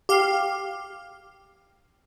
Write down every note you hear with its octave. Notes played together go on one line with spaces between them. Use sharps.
G4 F5